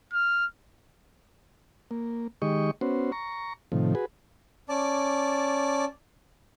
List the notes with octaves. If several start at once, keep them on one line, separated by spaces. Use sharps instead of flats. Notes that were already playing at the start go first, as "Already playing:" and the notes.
F6
A#3
D#3 G#3 G4 D#5 C#6
B3 C#4 F#4 C5
A#5 C#6
A2 C3 D#3 F3
F#4 G#4 B4
C#4 D5 A5 D6